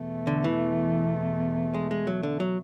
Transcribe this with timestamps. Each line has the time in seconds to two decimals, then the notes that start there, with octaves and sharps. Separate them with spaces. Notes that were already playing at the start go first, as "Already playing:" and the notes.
Already playing: E2 B2 A3
0.27 D3
0.44 E3
1.74 G#3
1.91 G#3
2.07 F#3
2.23 D3
2.40 F#3